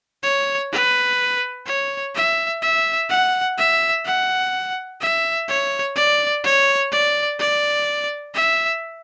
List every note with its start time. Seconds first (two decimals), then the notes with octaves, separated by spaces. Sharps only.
0.23 C#5
0.72 B4
1.67 C#5
2.15 E5
2.62 E5
3.09 F#5
3.58 E5
4.05 F#5
5.01 E5
5.48 C#5
5.96 D5
6.44 C#5
6.91 D5
7.39 D5
8.34 E5